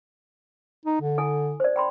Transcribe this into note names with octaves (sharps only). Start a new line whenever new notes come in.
D#4
D3
E4 A4 G#5
C5 D5
G5 B5 C6